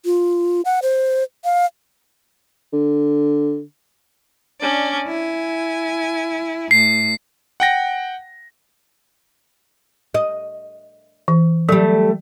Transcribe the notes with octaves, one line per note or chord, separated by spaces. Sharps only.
F4
F#5
C5
F5
D3
C#4 D4 D5
E4 G#5
A2 C7
F#5 G5 A#6
D#5
E3
F#3 G3 A3